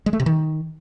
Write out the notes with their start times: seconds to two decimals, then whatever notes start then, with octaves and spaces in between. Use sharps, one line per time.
0.06 G#3
0.13 A3
0.20 C3
0.26 D#3